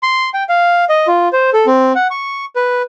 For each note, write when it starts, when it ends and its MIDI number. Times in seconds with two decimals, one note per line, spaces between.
0.03 0.30 84
0.34 0.43 79
0.49 0.85 77
0.89 1.07 75
1.07 1.28 65
1.33 1.50 72
1.53 1.66 69
1.66 1.93 60
1.95 2.07 78
2.11 2.45 85
2.56 2.82 71